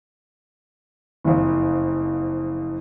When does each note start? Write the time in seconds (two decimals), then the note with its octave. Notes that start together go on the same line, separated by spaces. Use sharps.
1.24 F#1 F2